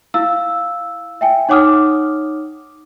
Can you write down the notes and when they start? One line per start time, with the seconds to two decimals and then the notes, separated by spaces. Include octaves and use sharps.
0.14 E4 F5 E6
1.21 E5 G5 G#5
1.49 D#4 C#5 F#5 D6 D#6 F6